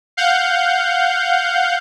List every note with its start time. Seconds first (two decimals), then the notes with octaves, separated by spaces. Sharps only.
0.17 F5 F#5 G6